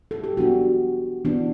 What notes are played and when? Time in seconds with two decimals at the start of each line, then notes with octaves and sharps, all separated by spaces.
0.11 A4
0.24 G4
0.37 E3 B3 D4 F#4
1.25 E3 B3 D4